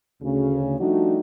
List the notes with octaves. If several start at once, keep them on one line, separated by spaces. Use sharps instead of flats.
D2 C#3
F3 G3 A3 D4 D#4 F#4